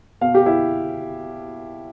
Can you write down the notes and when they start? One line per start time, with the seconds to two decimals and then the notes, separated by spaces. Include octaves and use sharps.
0.21 B2 F5
0.35 G4
0.46 E4